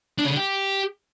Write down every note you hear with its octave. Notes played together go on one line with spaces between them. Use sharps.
D4
C#3
D3
G4